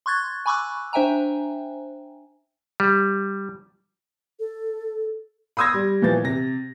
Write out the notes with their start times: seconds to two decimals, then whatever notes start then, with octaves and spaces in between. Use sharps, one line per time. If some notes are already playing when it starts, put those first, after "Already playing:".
0.06 C6 C#6 F#6 G#6 A6
0.46 G#5 B5 C#6 D6 E6 F#6
0.93 D4 C5 E5 G5 G#5 A#5
2.80 G3
4.40 A4
5.57 B5 C6 D#6 E6 G#6 A#6
5.74 G3
6.02 A#2 E3 F3 A6
6.24 C3 A#6